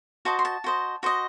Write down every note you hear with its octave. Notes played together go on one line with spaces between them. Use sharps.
F#4 C5 D#5 A5
C6
A5
F#4 C5 D#5
F#4 C5 D#5